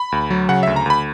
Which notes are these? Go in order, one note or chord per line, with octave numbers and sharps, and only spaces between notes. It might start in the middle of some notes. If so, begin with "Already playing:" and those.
Already playing: B5
D2
F#3
C#3 F#5
D2 E5
A#5
D2 B5